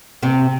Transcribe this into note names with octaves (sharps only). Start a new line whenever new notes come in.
C3 C4